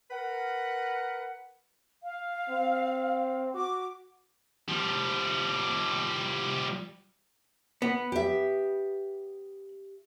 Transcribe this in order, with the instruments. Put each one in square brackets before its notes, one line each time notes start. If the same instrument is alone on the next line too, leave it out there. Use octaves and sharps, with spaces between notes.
[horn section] A#4 B4 F#5
[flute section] F5
[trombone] C4
[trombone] F#4 [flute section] D6
[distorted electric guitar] F3 G3
[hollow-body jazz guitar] B3
[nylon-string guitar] G4 E5